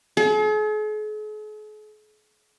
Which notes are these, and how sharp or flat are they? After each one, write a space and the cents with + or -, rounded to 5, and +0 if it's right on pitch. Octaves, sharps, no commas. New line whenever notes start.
G#4 +45